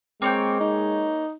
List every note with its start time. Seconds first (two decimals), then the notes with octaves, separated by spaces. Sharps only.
0.22 G#3 A#3 C4 C#5 G5
0.60 D#4